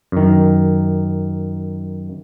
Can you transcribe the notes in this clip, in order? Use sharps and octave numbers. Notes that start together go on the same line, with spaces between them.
F#2 D#3